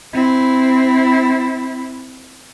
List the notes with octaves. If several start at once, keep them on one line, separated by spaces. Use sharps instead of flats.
C4 E4